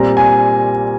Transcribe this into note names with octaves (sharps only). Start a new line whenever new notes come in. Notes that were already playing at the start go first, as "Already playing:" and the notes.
Already playing: A#2 G3 C4 A#5
G#5